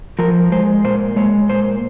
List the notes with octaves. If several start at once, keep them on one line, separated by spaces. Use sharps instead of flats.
F3 A#4
G#3 C5
A#2 C5
G#3 C#5
A#2 C5